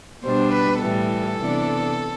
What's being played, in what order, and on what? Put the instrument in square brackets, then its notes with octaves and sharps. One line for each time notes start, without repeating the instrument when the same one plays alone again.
[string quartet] B2 G3 D4 C5
B4
A2 E3 G3 A4
C3 E3 B3 D4